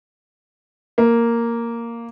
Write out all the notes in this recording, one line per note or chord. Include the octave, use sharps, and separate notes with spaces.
A#3